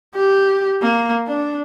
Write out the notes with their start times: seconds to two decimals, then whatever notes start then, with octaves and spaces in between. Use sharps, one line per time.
0.15 G4
0.82 A#3
1.27 D4